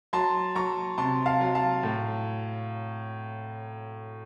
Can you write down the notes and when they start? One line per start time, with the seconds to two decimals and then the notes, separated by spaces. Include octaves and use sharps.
0.13 F#3 A5 C6
0.55 F#3 A#5 C#6
0.98 C3 A5 C6
1.26 F5 A5
1.41 F#3
1.55 F5 A5
1.83 A2